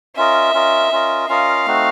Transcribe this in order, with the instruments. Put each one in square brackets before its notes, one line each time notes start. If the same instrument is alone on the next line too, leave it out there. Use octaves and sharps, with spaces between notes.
[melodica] C#4 F4 A#4 D#5 [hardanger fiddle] E5
[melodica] C#4 F4 A#4 D#5
C#4 F4 A#4 D#5
[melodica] C#4 F4 A#4 D#5 [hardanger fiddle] F5
[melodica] A3 C4 D#4 F#4